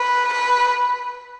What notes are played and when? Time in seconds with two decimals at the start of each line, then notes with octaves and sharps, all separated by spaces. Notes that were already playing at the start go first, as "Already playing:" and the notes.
Already playing: B4
0.33 B4